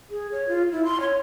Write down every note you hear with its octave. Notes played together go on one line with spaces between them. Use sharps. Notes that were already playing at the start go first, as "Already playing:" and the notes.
G#4
C#5
F4
E4
C6
C#5